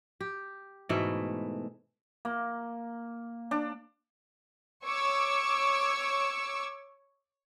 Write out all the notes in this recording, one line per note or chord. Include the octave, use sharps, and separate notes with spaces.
G4
G#2 B2 E3 A3
A#3
D4
C#5 C#6 D6 E6